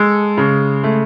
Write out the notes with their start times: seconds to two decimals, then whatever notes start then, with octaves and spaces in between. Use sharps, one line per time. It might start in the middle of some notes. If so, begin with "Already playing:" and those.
Already playing: G#3 A4
0.37 C#3
0.84 A3